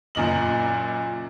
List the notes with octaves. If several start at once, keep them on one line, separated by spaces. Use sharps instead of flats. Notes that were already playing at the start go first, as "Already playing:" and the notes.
F#1 F#2 A#2 D#5 F#7